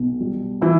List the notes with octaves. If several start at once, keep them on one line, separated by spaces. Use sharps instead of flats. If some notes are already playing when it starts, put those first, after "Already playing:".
Already playing: B1 B2
G3
E3 E4